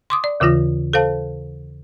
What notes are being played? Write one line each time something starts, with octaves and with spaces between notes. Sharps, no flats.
C6 D6 D#6
D5
D#2 C#3 E3 F4 A#6
A4 C5 F5 A5